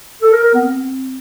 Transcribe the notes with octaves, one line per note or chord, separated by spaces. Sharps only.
A4
A#4
A#4
B3
C4